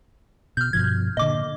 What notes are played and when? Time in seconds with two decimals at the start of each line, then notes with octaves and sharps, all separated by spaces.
0.57 B2 F6 G6
0.73 G2 B2 F3 G#6
1.17 A#2 D3 D#5 D6